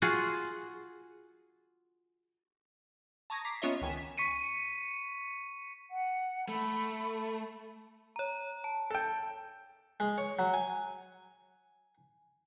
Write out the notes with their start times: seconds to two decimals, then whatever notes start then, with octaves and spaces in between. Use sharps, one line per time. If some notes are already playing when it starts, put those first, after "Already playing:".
0.02 F4 F#4 G#4
3.30 A5 A#5 C#6 D#6 G#6 A#6
3.45 A#5 D6 B6 C7
3.62 B3 C#4 F4 C#5 D#5 E5
3.82 C#2 D#3 G#5 B6 E7
4.18 C#6 B6 C#7 D#7
5.91 F#5
6.48 A3 B5
8.16 C#5 A#5
8.64 A5
8.91 A4 G5
10.00 G#3
10.18 C#5
10.39 F#3
10.54 G#5